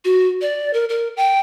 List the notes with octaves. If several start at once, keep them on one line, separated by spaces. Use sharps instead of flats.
F#4
D5
A#4
A#4
G5